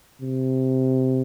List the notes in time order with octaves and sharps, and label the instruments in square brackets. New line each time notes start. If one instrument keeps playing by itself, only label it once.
[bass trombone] C3